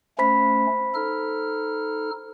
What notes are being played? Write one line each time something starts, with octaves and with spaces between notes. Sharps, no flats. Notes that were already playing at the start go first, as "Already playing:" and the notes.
A3 C#4 C5 B5 B6
D#4 A4 F6